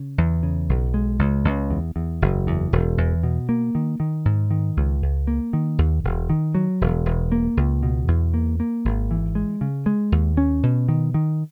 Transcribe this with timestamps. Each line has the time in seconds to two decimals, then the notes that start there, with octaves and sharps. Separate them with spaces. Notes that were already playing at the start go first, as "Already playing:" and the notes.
Already playing: C#3
0.18 E2
0.43 C#3
0.69 B1
0.94 G#3
1.19 C#2
1.45 C#2
1.70 E2
1.96 E2
2.22 F#1
2.47 E2
2.73 E1
2.98 E2
3.23 B2
3.49 A#3
3.75 D#3
4.00 D#3
4.25 G#2
4.51 D#3
4.77 C#2
5.02 C#2
5.27 A#3
5.53 D#3
5.78 D#2
6.04 E1
6.30 D#3
6.55 F#3
6.81 E1
7.06 E1
7.32 A#3
7.57 C#2
7.83 B2
8.08 E2
8.34 A#3
8.60 A#3
8.85 G#1
9.11 E3
9.35 G#3
9.61 C#3
9.86 G#3
10.12 D#2
10.37 C#4
10.63 B2
10.89 D#3
11.14 D#3